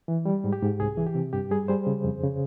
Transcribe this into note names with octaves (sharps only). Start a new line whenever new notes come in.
E3
G3
G#2
G4
G#2
C2 G#4
E3
G4
C3
G2 G4
G3 G#4
G3 G#4 C5
C#3
F2
C#3